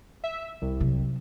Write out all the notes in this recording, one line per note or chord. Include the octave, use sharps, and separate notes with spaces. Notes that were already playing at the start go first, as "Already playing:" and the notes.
E5
C2
C3 F#3